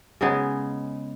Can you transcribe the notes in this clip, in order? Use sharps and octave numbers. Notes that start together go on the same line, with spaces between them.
C#3 G#3 B3 D#4